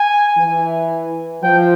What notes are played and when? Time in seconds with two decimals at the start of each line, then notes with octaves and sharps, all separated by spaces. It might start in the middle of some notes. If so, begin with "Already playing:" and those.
Already playing: G#5
0.38 E3
1.43 F3 G5